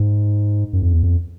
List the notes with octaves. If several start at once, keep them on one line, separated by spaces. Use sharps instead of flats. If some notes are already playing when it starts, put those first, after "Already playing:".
Already playing: G#2
F#2
F2
E2
F2